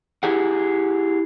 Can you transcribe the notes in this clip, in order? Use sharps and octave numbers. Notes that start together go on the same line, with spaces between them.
E4 G4 G#4 F#5